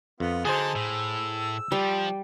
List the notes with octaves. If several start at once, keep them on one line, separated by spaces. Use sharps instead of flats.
F2 B3 F4
D3 F#3 D#4 G#4 C5 A5
A2 E6
F3 G3